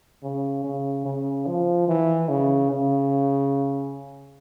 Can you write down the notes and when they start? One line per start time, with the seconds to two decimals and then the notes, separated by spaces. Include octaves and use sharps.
0.23 C#3
0.64 C#3
1.06 C#3
1.47 F3
1.88 E3
2.29 C#3
2.71 C#3